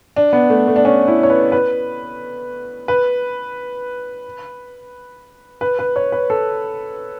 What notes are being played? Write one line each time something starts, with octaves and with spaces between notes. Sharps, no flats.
D4
B3
A3
A3
D4
C#4
E4
C#5
B4
B4
B4
B4
B4
C#5
B4
A4